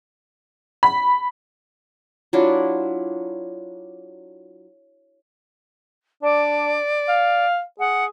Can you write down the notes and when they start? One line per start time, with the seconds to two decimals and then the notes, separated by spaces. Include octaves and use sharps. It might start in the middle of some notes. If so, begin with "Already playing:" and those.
0.83 B5
2.33 F#3 D4 E4 F4
6.23 D4 D5
7.09 F5
7.79 G#4 F#5